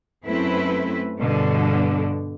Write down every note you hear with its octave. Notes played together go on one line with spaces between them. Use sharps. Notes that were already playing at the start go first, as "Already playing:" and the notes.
F#2 A3 C4 E4 B4
G2 B2 D3